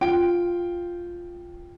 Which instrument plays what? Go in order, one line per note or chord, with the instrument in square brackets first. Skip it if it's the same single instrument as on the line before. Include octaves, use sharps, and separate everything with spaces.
[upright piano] F4 G5 D7